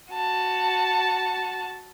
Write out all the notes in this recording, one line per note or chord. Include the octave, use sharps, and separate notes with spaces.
F#4 A5